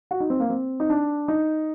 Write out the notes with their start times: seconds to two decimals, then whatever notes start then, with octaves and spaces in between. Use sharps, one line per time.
0.11 F#4
0.20 D#4
0.30 C4
0.40 A#3
0.50 C4
0.80 D#4
0.90 D4
1.28 D#4